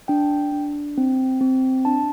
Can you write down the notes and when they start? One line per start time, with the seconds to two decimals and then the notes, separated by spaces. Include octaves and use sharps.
0.08 D4 G5
0.52 D4
0.98 C4
1.41 C4
1.85 D4 A5